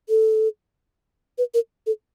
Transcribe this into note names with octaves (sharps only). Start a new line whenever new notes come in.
A4
B4
A#4
A4